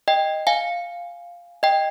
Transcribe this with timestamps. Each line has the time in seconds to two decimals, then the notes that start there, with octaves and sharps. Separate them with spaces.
0.08 D#5 G5
0.47 F5 G#5
1.63 D#5 G5